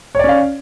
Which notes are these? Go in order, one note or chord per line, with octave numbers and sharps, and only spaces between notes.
C#4 C#5 D5 F5